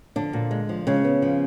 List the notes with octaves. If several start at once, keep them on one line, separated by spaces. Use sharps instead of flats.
D3 F3 D4
A#2
G#3
F3
C#3 G#3 C#4
B3
F3